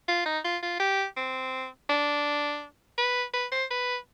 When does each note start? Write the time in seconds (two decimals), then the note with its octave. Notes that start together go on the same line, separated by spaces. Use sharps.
0.08 F4
0.26 D#4
0.45 F4
0.63 F4
0.80 G4
1.17 C4
1.90 D4
2.98 B4
3.34 B4
3.52 C5
3.71 B4